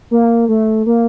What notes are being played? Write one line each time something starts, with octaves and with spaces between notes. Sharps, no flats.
A#3
A3
A#3